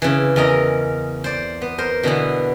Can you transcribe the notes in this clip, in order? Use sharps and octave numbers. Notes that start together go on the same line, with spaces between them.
C#3 E3
E2 C#4 A#4 D#5 A#5
C5 D5
B3
A#4 C5
B2 D3 E3 B3